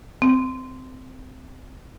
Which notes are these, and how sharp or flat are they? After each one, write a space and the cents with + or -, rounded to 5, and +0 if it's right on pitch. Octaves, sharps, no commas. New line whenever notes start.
C4 -20